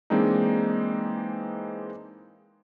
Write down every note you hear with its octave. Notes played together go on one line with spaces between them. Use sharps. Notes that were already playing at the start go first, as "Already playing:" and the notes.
E3 G#3 A#3 C4 D4 D#4